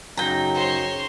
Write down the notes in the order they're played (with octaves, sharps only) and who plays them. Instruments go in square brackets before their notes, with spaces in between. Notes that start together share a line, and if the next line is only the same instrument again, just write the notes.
[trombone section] F#2 C#3 [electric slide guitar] F#3 D#4 [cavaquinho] G5 A#5
[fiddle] C5 C#5